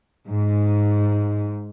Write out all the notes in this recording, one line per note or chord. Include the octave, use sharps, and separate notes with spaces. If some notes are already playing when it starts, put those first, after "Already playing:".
G#2